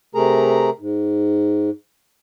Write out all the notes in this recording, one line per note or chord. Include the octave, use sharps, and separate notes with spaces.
C3 A3 G#4 A#4 A#5
G#2